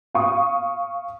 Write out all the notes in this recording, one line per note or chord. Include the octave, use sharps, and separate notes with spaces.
F5 C#6 D#6